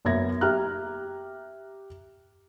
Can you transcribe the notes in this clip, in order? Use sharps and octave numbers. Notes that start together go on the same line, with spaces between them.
F#1 F#2 B3 E5 G#6 A#6
G4 E5 A#5 F6 F#6